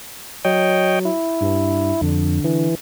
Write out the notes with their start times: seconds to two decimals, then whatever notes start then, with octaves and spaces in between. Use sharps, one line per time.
0.45 F#3 C#5 D#5 G5
1.05 E4
1.41 G2
2.01 F2 D3
2.44 E3